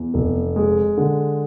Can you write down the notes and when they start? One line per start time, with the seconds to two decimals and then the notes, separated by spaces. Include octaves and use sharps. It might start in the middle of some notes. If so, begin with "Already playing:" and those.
Already playing: E2
0.14 F1
0.56 G#3
0.97 D3